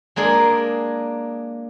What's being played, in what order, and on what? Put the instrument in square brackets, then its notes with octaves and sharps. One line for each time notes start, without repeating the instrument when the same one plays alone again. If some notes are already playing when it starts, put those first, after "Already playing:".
[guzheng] G#3 A#3 D4 G#4